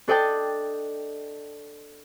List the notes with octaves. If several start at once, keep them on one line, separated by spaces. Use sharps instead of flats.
D4 A4 D5 D#5 G5 A5